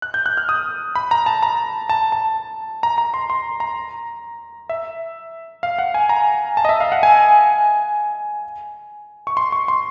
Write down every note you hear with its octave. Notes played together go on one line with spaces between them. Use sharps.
F#6
G6
F#6
F6
D#6
B5
A#5
A5
A#5
A5
A5
A#5
A#5
C6
C6
A#5
E5
F5
F#5
G#5
A#5
A5
D#5
E5
F5
F#5
G#5
C#6
C6
C#6
C6